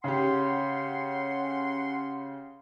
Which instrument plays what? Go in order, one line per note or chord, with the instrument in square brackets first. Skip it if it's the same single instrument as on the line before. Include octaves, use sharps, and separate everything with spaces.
[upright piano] C#3 G4 [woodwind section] C#4 F#5 C6